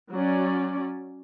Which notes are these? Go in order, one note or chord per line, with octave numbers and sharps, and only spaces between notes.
F#3 C#4 D5